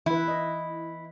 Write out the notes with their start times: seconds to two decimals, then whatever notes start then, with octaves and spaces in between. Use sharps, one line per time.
0.06 E3 E4 B4
0.28 D#5